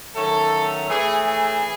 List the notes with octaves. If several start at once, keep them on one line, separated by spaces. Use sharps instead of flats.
D#3 F#3 A3 C#4 A4
A2 E3 A3 G#4
G#4